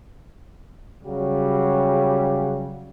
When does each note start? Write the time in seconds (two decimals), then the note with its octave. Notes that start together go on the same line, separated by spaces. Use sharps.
1.03 C#3 F#3 G3